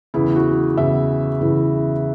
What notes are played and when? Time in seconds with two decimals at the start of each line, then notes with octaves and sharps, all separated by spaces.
0.14 E2 C#3 E3 E4
0.36 F#4
0.77 E2 C#3 E3 E5
1.41 E2 C#3 E3